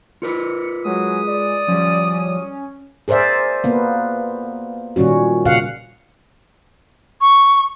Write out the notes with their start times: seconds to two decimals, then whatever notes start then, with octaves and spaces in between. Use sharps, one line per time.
0.22 F4 A#4 B4 C#7
0.85 F#3 G#3 D#6
1.28 D5
1.68 F3 G3 C#4
3.08 G#4 A#4 C5 D5 E5
3.64 A#3 B3
4.96 A#2 D#3 G3 C#4 F#4
5.45 A#2 C#3 F5 F#5
7.21 C#6